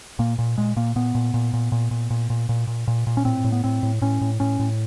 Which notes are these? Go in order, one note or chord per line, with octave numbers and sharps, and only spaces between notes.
A#2 A#3
A#2
A#2 G#3
A#2 A#3
A#2 B3
A#2
A#2
A#2
A#2
A#2
A#2
A#2
A#2
A#2
A#2
A#2
C#4
A2 C4
A2
B3
A2 C4
A2
A2 C#4
A2
A2 C#4
A2